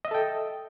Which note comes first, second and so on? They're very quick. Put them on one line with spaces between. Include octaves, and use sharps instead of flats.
D#5 E5 A4 G5